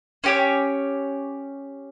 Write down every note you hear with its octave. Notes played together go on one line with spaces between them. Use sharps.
C#4 G4 C#5